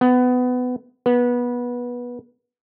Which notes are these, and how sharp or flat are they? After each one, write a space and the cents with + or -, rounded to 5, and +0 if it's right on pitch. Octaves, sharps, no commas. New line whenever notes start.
B3 +20
B3 -20